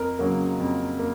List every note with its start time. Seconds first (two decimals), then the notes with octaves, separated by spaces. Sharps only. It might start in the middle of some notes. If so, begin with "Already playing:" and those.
Already playing: F2 A#4
0.19 C#3 F#3 A#3
0.59 F2
0.99 A#3